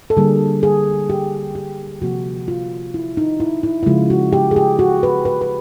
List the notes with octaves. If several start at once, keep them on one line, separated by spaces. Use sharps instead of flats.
A4
D3 G3 A#3 G#4
G#4
G4
G4
C3 F3 A#3 F#4
F4
E4
D#4
E4
E4
E4
C#3 F3 G#3 F4
F#4
G4
G#4
G4
F#4
B4
B4
B4